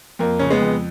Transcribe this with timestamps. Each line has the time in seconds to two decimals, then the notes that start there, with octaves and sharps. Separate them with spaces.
0.19 F2 A#3
0.39 C#3 C#4
0.50 G#3 B3
0.61 F2